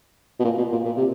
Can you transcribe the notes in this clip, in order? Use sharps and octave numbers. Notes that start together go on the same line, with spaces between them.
B2
A#2
B2
A#2
A#2
C3